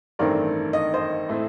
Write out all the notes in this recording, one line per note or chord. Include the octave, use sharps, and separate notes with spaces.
A1 G2 D#3 A3 C4 A#4 D5
D#5
C5 D#5
A2 A3 C4